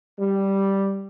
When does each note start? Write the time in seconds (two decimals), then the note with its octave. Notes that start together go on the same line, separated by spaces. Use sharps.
0.20 G3